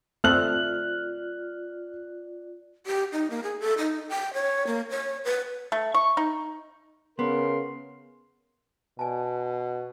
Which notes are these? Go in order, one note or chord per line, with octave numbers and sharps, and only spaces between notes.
A3 C4 F4 A4 D5 F6 F#6 F#7
G4
D#4
A#3
G#4
A4
D#4
G5
C#5
A#3
C#5
B4
A3
C#6
D#4
C#3 B3 A#4 C6
B2 D5 G#5 A5